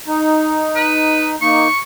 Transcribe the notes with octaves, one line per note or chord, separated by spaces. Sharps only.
D#4
B4
A#3 D#4 C#6